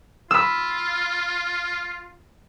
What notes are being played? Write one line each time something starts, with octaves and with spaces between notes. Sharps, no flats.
F4 B5 E6